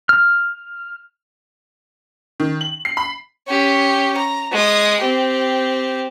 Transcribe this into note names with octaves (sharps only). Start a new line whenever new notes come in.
F6
D#3
F#7
C7
B5
C#4 G4
A#5
G#3 D#6
C4 G4